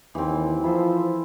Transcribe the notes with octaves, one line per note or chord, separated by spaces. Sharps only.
D#2 E3 C4
F3 E4 A4 C5